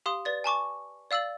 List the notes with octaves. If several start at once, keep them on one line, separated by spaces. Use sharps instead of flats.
G4 F5 C6 D#6
B4 D5 A6
G#5 A5 C#6 D6
D5 F5 E6 A6 F#7